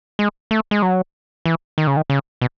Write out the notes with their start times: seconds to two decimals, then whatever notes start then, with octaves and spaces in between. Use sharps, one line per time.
0.19 G#3
0.51 A3
0.71 G#3
0.82 F#3
1.46 E3
1.78 D#3
1.87 C#3
1.97 D#3
2.10 C#3
2.41 B2